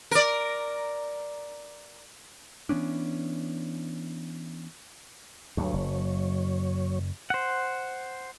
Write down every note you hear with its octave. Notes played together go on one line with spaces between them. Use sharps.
A#4 D5
E3 B3 C#4 D4
D2 G2 F#3 C#5
F#1
C5 F#5